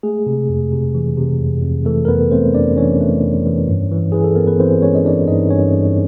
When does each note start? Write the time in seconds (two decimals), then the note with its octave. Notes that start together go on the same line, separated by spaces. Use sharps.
0.03 G#3 A3 G#4
0.26 C3
0.49 F2
0.72 C3
0.94 E3
1.18 C3
1.41 F2
1.63 F2
1.85 E3 A3 A4
2.05 A#4
2.08 F2 B3 B4
2.31 A3 C4 C5
2.54 F2 D4 D5
2.77 E3 C#4 C#5
3.01 A3
3.23 F2
3.46 E3
3.68 G2
3.91 E3
4.12 E3 G#4
4.24 A4
4.36 B3 A#4
4.47 B4
4.59 E3 C4 C5
4.82 G#3 C#4 C#5
4.95 D#5
5.05 E3 D4 D5
5.28 G2 D#4 D#5
5.50 G2 C#4 C#5
5.74 G2